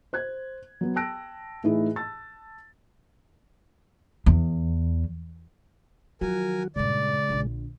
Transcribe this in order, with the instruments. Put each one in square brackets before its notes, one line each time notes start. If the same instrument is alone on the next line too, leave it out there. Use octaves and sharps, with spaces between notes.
[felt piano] C5 F#6 G#6
F#3 B3
G5 A5 E6 F#6 A#6 D7
A2 E3 A3 D#4 E4 G#4
A5 E6 A6
[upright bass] E2
[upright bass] D#3 F3 [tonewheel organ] F#3 F#4 [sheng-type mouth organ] A#4 G#5
[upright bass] G2 A#2 [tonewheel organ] C#3 G#3 [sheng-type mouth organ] D5
[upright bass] A#1 D3